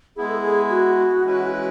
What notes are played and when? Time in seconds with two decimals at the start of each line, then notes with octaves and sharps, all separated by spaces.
0.16 G#3 B3 E4 G#4
0.28 A4
0.41 G#4
0.70 F#4
1.24 E3 G#3 C#4 E4 B4